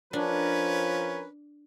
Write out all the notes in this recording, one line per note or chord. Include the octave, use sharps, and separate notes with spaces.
F3 C#4 D4 A#4 B4